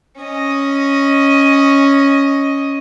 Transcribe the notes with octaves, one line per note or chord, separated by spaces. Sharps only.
C#4 D#5